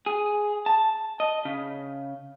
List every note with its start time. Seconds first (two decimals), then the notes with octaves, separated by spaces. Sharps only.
0.06 G#4
0.66 A5
1.20 D#5
1.45 C#3